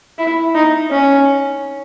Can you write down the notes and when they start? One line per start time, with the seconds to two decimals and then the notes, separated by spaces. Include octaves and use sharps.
0.18 E4
0.55 D#4
0.91 C#4